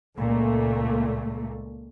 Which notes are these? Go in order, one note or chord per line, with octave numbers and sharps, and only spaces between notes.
C#2 A#2 A3